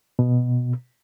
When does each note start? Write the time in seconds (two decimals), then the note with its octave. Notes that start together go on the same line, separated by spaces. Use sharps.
0.19 B2